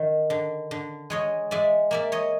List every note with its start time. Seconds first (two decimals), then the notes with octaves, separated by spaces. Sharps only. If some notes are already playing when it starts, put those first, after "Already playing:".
Already playing: D#3
0.30 D3
0.71 D3
1.10 G#3 C#5 D#5
1.51 G#3 D5 E5
1.91 A#3 D5 E5
2.12 C#5 D#5